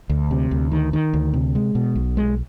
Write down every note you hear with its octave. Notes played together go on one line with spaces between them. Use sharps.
D2
C3
D2
D#3
D#3
D2
C3
G#3
B2
B1
G#3